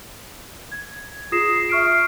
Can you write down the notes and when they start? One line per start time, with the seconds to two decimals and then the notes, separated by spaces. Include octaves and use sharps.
0.72 G#6
1.32 F4 G#4 D#6 A#6 C7 E7
1.69 E5 C#6 F6 C7 D7